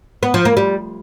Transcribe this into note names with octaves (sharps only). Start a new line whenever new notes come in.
B3
F3
A#3
G3